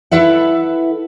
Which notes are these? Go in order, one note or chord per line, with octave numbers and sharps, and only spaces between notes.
E4 A4 B4 E5 F#5